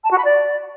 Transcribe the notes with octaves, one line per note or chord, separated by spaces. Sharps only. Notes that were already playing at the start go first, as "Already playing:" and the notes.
A5
F#4
B5
D5